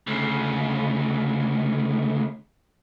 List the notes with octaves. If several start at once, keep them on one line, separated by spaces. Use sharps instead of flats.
D2 C#3